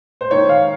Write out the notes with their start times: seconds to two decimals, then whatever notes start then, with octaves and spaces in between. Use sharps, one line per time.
0.21 C5
0.31 D#3 C#5
0.49 F5